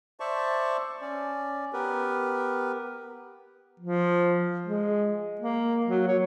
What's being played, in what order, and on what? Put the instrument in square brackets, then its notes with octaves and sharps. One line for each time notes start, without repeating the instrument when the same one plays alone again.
[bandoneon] C5 D5 E5 A5 C#6
C#4 D5
B3 G4 A#4 B4
[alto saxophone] F3
G#3
A#3
F#3
C#5